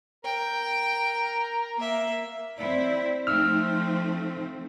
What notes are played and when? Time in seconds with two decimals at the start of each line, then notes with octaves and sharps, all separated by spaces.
0.24 A#4 G5
1.76 A#3 E5
2.58 C4 E4 D5
3.27 F3 A3 C4 D#4 E6 F6